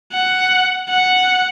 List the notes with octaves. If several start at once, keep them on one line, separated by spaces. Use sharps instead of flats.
F#5
F#5